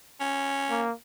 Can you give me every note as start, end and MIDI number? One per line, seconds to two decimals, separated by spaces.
0.20 0.83 61
0.70 0.92 58